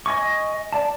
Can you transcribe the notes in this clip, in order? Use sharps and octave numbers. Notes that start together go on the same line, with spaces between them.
D#5 G#5 C#6
D5 A5